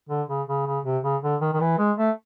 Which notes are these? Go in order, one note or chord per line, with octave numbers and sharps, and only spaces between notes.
D3
C#3
C#3
C#3
C3
C#3
D3
D#3
D#3
E3
G#3
A3